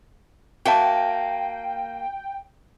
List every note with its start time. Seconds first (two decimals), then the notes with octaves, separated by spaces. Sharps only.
0.66 A#3 F#4 E5 G5 A5